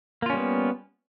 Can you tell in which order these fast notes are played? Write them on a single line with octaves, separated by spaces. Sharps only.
A#3 F4 C#4 G3 B3